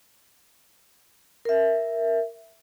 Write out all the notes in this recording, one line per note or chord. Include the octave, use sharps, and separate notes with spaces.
A#4 E5